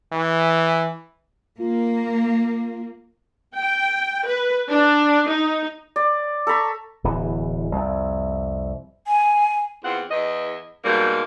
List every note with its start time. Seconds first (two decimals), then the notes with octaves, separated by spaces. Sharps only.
0.12 E3
1.59 A#3 F4
3.55 G5
4.26 B4
4.70 D4
5.28 D#4
5.96 D5
6.47 A4 A#5 B5 C#6
7.04 D1 E2 E3
7.72 C2 F2
9.07 G#5
9.84 E2 C4 F4 F#5
10.11 E2 D#5
10.84 G#2 B2 G3 A#3